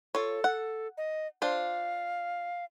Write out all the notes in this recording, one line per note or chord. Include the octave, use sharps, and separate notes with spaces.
F4 A4 C#5
F#5
D#5
D4 F4 C5 F5